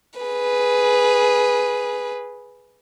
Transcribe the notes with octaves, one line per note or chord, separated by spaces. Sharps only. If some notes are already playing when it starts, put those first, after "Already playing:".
G#4 B4